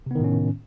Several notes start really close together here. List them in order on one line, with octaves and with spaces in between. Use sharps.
C3 B3 D#3 A2 C#4